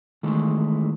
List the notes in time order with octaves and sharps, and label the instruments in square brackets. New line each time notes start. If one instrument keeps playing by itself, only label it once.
[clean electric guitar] D#3 E3 G#3 A3